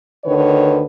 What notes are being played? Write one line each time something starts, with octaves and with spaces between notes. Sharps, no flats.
D2 D3 D#3 B4 C#5